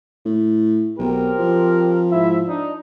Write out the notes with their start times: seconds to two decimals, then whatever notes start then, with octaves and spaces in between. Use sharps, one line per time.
0.25 A2
0.99 B1 C4 G4 A#4
1.39 F3
2.11 G#2 E4 E5
2.48 D4 D#4